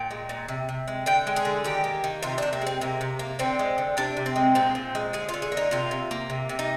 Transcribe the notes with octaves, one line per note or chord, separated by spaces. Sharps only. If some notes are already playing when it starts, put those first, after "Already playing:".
Already playing: A#2 G5
G#3
A#2
C3
C3
G#3
D3 G5
G#3
G#4
D3
D#3 G4
A#3
D#3
C3 F4
C3 D4
A#3
G#3
C4
C3 A#3
C3
A#3
D3 C4
G#3
D3
C3 D4
C3
C4
G#3
A#2 C4
A#2
G#3
D3 G#4
F4
D3
G#4
A#3
D#4
C3 F4
C3
A#3
C3
C3
D#4